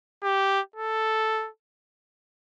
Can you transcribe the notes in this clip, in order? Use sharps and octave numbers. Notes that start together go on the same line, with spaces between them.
G4
A4